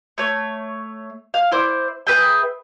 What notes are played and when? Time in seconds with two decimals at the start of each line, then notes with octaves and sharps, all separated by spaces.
0.18 A3 C#5
1.34 F5
1.51 E4 C5 D5
2.07 G#4 B4 E5 G5